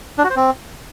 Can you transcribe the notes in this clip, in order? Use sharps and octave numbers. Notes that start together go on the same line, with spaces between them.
D4
F#4
C5
C4